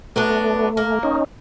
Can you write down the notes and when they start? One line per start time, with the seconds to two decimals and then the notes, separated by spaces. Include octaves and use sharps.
0.16 F#3 A3 B3 D4
0.77 A#3
1.03 C#4 D#4